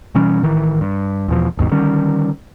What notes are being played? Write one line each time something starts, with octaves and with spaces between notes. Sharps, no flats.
B2 E3 G3 C#4
A1 D#3 E3
G2
E2 B2 F3
G#1 D#2 G#2 B2
D3 D#3 G3 C#4